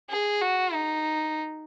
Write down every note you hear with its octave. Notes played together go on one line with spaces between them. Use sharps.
G#4
F#4
D#4